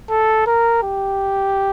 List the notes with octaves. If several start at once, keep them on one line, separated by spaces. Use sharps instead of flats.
A4
A#4
G4